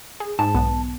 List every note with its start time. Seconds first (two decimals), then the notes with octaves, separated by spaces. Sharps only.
0.20 G#4
0.39 G#2 A5
0.55 B1 B3